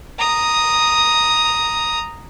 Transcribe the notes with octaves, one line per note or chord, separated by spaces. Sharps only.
A#5 D#6